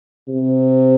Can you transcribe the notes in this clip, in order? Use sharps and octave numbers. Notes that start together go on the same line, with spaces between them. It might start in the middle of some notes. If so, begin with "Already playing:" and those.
C3